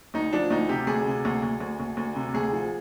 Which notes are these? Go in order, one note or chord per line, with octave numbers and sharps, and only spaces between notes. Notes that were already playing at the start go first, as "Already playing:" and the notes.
D2 D#4
F3 D4
D2 D#4
C3 G4
D2 G#4
C3
D2
D2
D2
D2
D2
C3
D2 G#4
F3